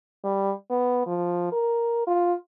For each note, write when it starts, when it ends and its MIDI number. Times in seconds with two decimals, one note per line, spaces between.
0.24 0.53 55
0.70 1.05 59
1.07 1.51 53
1.52 2.06 70
2.07 2.34 65